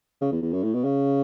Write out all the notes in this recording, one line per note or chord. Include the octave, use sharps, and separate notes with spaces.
C#3
E2
E2
F#2
A2
B2
C#3